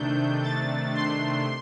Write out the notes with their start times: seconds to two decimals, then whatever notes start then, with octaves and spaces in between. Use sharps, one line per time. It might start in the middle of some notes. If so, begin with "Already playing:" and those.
Already playing: C3 D#3 A3 D4 G6
0.43 A6
0.94 C6